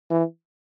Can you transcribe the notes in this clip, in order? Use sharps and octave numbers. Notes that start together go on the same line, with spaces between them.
E3